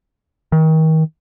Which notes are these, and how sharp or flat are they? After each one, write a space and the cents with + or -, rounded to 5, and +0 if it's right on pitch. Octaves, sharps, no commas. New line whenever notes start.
D#3 +35